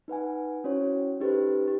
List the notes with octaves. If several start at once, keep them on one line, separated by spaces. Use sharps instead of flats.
D#4 B4 F#5 G#5
C#4 E4 F#4 C5 C#5
C#4 D#4 G4 A4 B4 C5
D#4 G4